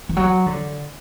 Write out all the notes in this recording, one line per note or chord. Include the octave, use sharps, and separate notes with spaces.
E3
F#3
D3